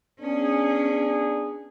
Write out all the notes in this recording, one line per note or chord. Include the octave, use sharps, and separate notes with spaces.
B3 C#4 D4 G#4